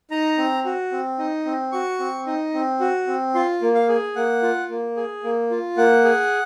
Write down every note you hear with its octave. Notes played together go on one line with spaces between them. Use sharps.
D#4 A#5
C4
F#4
C4
D#4
C4
F#4 C#6
C4
D#4
C4
F#4
C4
F4 C6
A#3
F5
G#4
A#3 F#5
F4
A#3
G#4
A#3
F4
A#3 F#5
G#4